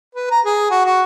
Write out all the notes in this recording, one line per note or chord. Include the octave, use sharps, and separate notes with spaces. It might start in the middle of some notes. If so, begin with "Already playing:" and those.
B4
A#5
G#4
F#4
F#4